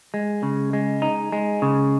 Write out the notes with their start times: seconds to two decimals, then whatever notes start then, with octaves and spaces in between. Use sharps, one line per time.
0.14 G#3
0.43 C#3
0.73 G#3
1.02 D#4
1.32 G#3
1.62 C#3